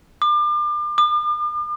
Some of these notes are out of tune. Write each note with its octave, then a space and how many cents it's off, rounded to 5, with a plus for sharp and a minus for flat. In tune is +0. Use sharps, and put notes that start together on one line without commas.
D6 +35
D6 +45